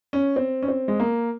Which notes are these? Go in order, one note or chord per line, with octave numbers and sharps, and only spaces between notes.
C#4
C4
C#4
C4
G#3
A#3